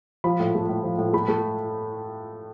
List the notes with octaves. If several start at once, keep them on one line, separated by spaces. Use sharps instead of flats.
F3 B5
A2
A3
A2
F3
A2
A3 B5
A3